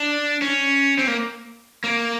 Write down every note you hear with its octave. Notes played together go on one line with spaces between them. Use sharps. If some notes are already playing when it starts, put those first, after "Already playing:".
Already playing: D4
C#4
C4
A#3
A#3